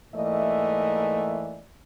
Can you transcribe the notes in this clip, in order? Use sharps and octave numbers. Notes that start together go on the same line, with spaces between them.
G#2 E3 A3 A#3 D5 D#5